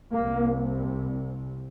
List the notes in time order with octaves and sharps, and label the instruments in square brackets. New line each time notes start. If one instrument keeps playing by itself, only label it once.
[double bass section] C2 C3 A#3